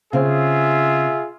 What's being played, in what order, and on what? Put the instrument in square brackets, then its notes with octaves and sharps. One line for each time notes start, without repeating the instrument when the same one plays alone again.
[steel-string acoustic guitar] C#3 C4 [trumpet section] F4 G#4 E5